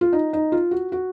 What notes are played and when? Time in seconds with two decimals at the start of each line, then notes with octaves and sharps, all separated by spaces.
0.01 F4
0.13 D#4
0.33 D#4
0.52 F4
0.71 F#4
0.92 F#4